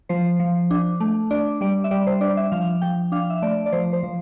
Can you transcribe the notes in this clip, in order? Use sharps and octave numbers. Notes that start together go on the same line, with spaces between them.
F3 C5
F3
D4
A3
D4 D5
G3 D5
E5
G3 D5
C5
D4 D5
E5
F3 F5
F3 G5
D4 F5
E5
A3 D5
D5
F3 C5
C5
F3